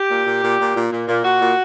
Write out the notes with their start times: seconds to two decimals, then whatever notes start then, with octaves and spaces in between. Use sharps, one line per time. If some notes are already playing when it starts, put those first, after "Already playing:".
Already playing: G4
0.10 A#2
0.26 A#2
0.43 A#2
0.59 A#2
0.75 A#2
0.92 A#2
1.08 A#2
1.24 A#2 F#4
1.40 A#2